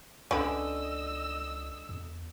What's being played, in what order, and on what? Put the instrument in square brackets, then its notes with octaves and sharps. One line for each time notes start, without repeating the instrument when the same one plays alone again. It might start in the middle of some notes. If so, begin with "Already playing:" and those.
[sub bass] C#2 [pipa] D3 [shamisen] C#4 B4 [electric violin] D#5 E6
[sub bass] E2